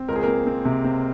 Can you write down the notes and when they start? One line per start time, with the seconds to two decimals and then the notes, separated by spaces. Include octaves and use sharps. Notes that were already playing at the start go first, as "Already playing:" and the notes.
Already playing: C4
0.08 C#2 A#4
0.16 G#4
0.23 A#3 C4 A#4
0.47 C4
0.65 C3
0.85 C4